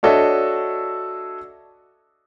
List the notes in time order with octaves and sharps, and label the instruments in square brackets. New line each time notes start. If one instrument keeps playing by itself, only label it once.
[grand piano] D4 F#4 A4 C#5 D#5 E5